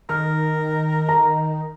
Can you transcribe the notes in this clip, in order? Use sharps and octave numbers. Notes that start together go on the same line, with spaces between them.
D#3 A#4 F6
A#5